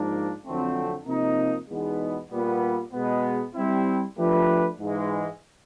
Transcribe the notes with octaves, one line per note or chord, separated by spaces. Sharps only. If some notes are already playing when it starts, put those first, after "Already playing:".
Already playing: G#2 F3 A#3 D4
F2 D3 F#3 A3 C4
C3 F3 A#3 D#4
E2 B2 G#3 B3 D#4
A#2 G3 B3
B2 G#3 B3
G3 C4 E4
F3 A3 D4 G4 B4
G#2 E3 G#3